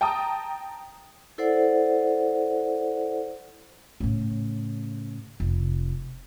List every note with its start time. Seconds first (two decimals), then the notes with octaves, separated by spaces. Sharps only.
0.01 G5 A5 A#5 D#6
1.38 E4 A4 C5 D5 F#5
4.00 A2 C#3
5.40 F1